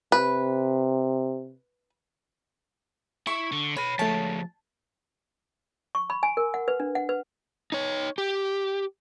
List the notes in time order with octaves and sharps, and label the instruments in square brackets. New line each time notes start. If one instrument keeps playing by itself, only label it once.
[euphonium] C3 [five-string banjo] B4
[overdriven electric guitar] E4 [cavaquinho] C#6
[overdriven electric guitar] D3
[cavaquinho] B4 [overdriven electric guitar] C#5 B5
[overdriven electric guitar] F3 G#3 [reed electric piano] A3 C#5 [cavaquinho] A5
[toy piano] C#6
B5
G#5
A#4
F#5
B4
D4
F#5
B4
[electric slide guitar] D#4 C#5
G4